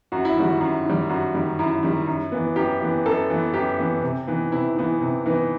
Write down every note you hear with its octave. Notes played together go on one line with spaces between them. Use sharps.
F#2 F#4
E4
D#3 G3 F#4
F#2
D#3 G3
F#2 F#4
D#3 G3
F#2 E4
D#3 G3
F#2
E3 B3
F#2 G4
E3 B3
F#2 A4
E3 B3
F#2 G4
E3 B3
C3
E3 B3 D#4
C3 E4
E3 B3 D#4
C3
E3 B3 D#4